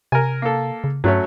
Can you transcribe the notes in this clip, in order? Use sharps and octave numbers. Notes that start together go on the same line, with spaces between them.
C3 A#4 G#5
A#3 A4
C#3
G2 F#3 A3 C#4